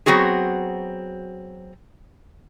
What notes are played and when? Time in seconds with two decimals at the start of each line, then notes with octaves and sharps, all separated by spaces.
0.06 F#3 B3 C4 F#4 G#4